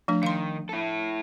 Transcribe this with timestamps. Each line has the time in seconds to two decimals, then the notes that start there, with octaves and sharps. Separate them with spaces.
0.08 F3 A3 D4
0.23 D#3 F5 C6
0.69 E4 A4